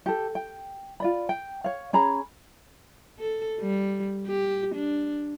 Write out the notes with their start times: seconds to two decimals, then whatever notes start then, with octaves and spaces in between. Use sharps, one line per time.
0.06 G4 A4
0.35 G5
1.00 F4 D5 B5
1.29 G5
1.64 C#5 F5
1.93 C#4 G#4 A#5 B5
3.19 A4
3.60 G3
4.27 G4
4.75 D4